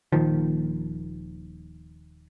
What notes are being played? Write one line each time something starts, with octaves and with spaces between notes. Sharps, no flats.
D#1 D#2 D#3 F3